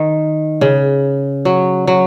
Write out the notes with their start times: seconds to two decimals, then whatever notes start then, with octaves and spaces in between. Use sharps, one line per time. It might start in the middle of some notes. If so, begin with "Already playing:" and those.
Already playing: D#3
0.61 C#3
1.45 F#3
1.87 F#3